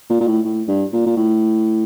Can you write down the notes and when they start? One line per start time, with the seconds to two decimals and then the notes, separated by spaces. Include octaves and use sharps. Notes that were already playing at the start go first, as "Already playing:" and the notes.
0.10 A#2
0.20 A#2
0.27 A2
0.45 A2
0.68 G2
0.93 A#2
1.06 A#2
1.17 A2